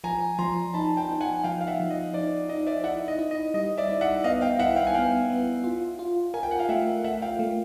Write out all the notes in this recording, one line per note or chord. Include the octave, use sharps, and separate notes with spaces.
F3 G#5 A#5
F3 A#5 C6
D#4 A5 B5
G5 A5
D#4
F#5 G#5
F3 F5 G5
F5
E5 F#5
F3
D#5
D#4 D5
D#4 D#5
D5 E5
E4 E5 F#5
D#5
E4
D#5
G3 D#5
D5 E5
E4
E5 F#5
B3 D#5 F5
F5 G5
E4 E5 F#5
F5 G5
G#5
B3 F5 G5
B3
F4
F4
A#4 G#5
G5
F#5
F5 G5
A3 E5 F#5
A3 E5 F#5
F5 G5
A3